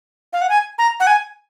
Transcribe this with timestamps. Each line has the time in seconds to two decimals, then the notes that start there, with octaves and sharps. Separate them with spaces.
0.33 F5
0.41 F#5
0.49 G#5
0.78 A#5
1.00 F#5
1.07 G#5